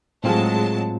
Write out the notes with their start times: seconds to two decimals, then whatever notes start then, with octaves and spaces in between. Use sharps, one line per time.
0.24 A2 F#3 G#3 C4 F4 A5